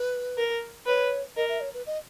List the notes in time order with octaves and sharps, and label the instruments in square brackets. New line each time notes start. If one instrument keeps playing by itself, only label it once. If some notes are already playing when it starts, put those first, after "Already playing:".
Already playing: [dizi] B4
[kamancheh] A#4
[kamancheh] B4 [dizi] C#5
[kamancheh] A#4 [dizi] D#5
[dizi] E5
C#5
B4
D#5